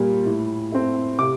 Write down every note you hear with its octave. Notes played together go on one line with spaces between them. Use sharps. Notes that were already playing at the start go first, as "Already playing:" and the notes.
Already playing: A#2 G3 A#3
A2
A3 C4
C3 D6